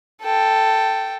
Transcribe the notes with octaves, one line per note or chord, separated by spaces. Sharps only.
A4 G5